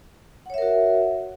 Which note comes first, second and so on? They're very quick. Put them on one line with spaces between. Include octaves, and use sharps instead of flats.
F#5 C#5 E5 A#4 F#4